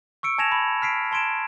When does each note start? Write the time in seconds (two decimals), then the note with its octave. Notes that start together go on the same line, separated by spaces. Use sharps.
0.23 C#6 E6 C#7 D7
0.38 G#5 A5 G#6 A#6 E7 F7
0.52 B5
0.82 F6 B6 C7 D7
1.12 A5 C6 G#6 D7 E7